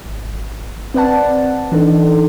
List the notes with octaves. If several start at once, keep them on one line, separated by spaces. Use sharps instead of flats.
G#1
C4 B4 D5 F#5 A5
E3 D4 D#4 A4